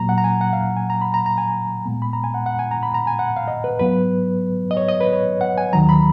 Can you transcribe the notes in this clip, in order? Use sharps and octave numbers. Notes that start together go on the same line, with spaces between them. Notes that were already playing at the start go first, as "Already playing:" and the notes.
Already playing: A#2 F#3 A#3 A#5
F#5
A#5
G#5
F#5
F5
G#5
A#5
B5
A#5
A#5
G#5
A#2 G#3 B3
B5
A#5
G#5
F#5
F#5
G#5
A#5
B5
A#5
G#5
F#5
F5
D#5
B4
G#2 F#3 B3 B4
D#5
C#5
D#5
B4
C#5
F#5
G#5
D#2 D#3 F#3 A#5
B5